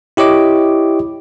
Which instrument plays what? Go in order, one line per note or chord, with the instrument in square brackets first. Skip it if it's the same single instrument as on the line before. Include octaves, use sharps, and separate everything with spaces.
[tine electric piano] E4 G4 C#5 D#5 D6